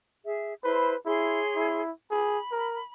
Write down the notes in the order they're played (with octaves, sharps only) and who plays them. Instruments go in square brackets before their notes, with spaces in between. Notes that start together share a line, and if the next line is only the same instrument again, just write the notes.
[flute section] G#4 E5
[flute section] E4 C5 C6 [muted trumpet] B4
[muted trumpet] E4 [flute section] G#4 C#5 C6
[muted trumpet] E4
[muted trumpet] G#4 [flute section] B5
[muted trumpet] A#4